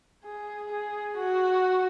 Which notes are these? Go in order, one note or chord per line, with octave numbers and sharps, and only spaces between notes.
G#4
G#4
F#4